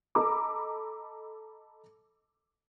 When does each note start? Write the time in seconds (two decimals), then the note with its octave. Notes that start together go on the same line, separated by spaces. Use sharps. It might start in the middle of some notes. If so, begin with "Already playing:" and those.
0.15 A4 D#5 A#5 B5 D6 E6